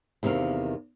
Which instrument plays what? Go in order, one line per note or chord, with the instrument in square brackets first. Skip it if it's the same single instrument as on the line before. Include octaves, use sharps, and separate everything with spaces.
[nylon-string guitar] E2 C3 D#3 A#3 F5